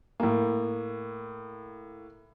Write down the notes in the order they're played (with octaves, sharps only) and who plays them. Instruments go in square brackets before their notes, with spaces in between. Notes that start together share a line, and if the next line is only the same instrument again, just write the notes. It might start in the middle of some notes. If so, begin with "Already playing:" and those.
[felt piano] A2 A#3